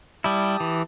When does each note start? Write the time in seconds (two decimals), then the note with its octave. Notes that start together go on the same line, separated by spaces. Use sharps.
0.24 G3 E4 G4 A5 D#6
0.60 E3